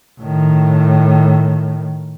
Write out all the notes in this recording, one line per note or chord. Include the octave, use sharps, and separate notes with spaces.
A2 D#3